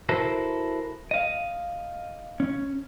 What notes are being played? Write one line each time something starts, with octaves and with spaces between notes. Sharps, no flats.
E4 F#4 A4 A#4 C5
D#5 F5
C#4